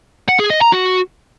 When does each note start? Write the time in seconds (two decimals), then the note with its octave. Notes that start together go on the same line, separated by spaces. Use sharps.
0.28 F#5
0.39 G#4
0.50 D#5
0.61 A#5
0.72 F#4